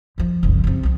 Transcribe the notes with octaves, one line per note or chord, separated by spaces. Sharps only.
D#2 F3
F#1 C2
A2 C3
C2 F2